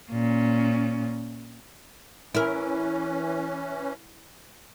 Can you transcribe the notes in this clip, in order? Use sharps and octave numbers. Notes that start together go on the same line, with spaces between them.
A#2 C#4
E3 C#4 E4 A#4